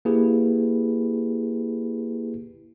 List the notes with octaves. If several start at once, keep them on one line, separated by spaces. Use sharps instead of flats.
A#3 E4 G4 G#4 B4